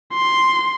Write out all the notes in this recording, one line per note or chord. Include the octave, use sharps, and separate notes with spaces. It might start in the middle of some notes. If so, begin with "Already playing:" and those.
C6